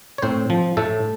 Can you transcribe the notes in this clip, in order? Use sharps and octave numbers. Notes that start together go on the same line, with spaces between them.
C#5
A2 C4 C5
F3
A2 A3 A4